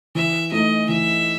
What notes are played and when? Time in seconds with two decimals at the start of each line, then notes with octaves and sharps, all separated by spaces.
0.15 E3 E5
0.52 A3 D#4 D#5
0.89 E3 E5